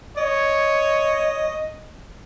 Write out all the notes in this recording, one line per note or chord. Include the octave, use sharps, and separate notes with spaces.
C#5 D#5